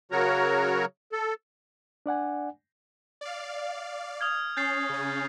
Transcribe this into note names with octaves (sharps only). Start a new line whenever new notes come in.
C#3 F#3 F#4 A#4 C#5 A#5
A4
D4 D5 F#5 G#5
D5 F5
D#6 F6 G#6
C#4 G6 A6 C7
C#3 C#4